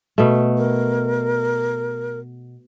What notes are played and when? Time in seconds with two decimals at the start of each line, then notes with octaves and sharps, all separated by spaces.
0.18 B2 A3
0.58 A#4